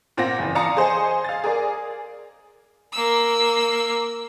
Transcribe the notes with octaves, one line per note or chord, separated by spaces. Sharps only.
A#2 C4 F4 F#5 A#6
F#1 E3
D5 F5 A5 A#5 D#6 C#7
G#4 C5 D#5 G#5
F5 A6
G#4 A#4 D5
A#3 E6